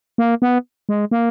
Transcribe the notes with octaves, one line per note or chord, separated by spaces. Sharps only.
A#3
B3
G#3
A#3